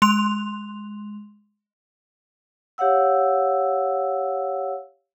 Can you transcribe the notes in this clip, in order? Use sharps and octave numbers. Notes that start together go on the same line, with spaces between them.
G#3 C6 F7
G4 C#5 F5 F#5 E6